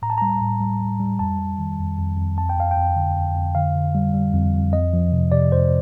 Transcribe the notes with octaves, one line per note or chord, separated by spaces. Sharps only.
A2 A#5
A5
G3 A#5
A2
G3
G3
G3
F2 A5
G3
D#3
F2
F2
F2
F2 A5
G5
F2 F5
G5
F2
D3
F2
F2
D3 F5
D3
G3
G3
F2
F2
F2 D#5
F3
C3
C3 D5
F2 C5